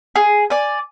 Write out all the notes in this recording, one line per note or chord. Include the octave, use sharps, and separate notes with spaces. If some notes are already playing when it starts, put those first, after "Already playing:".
G#4
D5 G#5